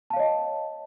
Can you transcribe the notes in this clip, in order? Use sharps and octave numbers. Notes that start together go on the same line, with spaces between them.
C#5 D#5 F5 A5